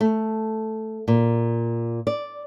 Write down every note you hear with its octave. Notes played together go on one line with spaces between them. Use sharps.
A3
A#2
D5